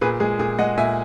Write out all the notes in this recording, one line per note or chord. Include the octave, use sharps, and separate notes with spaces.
A#2 G#4 B4
G#3 G#4
A#2 G#4
G#3 D#5 F#5
A#2 E5 G#5